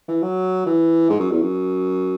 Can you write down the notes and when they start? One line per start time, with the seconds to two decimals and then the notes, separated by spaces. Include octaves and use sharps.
0.08 E3
0.22 F#3
0.66 E3
1.10 G#2
1.20 F#2
1.31 E2
1.42 F#2